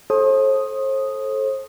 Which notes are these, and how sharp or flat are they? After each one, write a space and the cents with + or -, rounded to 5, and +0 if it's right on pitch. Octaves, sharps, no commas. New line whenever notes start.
A4 -20 C5 +40 D#6 +0